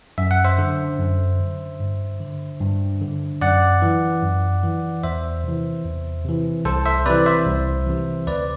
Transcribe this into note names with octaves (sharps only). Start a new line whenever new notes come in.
F#2 E5
F#5
C5 E5
D3
F#2
D3
G2
D3
G2
D3
F#2 D5 F#5
E3
F#2
E3
E2 C5 E5
C3 E3
E2
C3 E3
C2 A4 C5
C5 E5
C3 E3 B4 D5
C5 E5
C2
C3 E3
D2 B4 D5